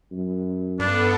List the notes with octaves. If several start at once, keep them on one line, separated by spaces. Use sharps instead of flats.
F#2
G2 B3 D4 A4